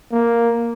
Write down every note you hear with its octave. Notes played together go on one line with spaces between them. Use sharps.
A#3